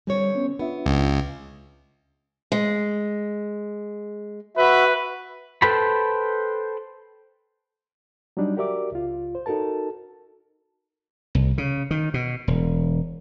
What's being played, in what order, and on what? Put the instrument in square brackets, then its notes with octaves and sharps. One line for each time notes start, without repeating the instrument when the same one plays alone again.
[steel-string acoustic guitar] D3 C4 C#5 [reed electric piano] G3
[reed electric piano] B3 C#4
[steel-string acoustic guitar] B3 [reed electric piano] D4 F4 E5
[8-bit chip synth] C#2
[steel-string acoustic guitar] G#3
[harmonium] F#4 E5 [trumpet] B4
[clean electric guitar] A4 B4 C5 G5 A5 B5
[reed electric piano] F#3 G3 D4 D#4
F#4 G4 A#4 D5 E5 D6
C#2 F4
C5
D#4 F#4 A4 A#4 A5
[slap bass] C2
C#3
D#3
B2
E1